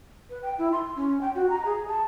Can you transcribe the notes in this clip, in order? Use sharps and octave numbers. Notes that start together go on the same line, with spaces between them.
B4
G5
E4
C6
C#4
G5
F#4
A#5
G#4
A5